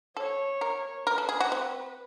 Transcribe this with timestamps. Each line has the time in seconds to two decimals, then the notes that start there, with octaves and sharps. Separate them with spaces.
0.17 A4 C#5
0.61 A#4
1.07 A#4 B4
1.18 A4
1.29 G#4
1.40 F#4
1.52 C4